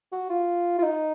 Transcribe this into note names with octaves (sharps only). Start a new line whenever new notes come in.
F#4
F4
F4
D#4